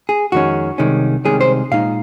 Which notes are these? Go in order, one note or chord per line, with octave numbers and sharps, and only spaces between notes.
G#4
F2 D#3 G#3 C#4 F#4
C2 C3 D#3 G#3 C#4
C2 C3 D#3 G#3 C#4 G#4
C5
A#2 G#3 D#4 F5